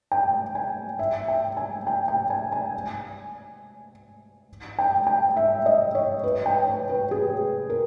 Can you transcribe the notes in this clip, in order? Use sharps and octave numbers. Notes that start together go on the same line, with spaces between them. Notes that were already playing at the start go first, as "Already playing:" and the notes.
G5
G#5
E5
G5
G#5
G5
G5
G#5
G#5
G5
G5
E5
D#5
C#5
B4
G5
C#5
B4
G#4
A#4